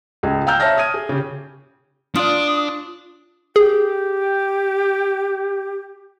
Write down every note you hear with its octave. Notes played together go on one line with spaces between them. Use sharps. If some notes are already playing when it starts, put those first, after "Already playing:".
C#2 G#4
F5 G5 A#5 E6 F6 G6
C#5 E5 A5 F6 A#6
D#6 F6 G#6 D#7
G#4
C#3 G4
D4 F4 D5 D#6
G4 G#4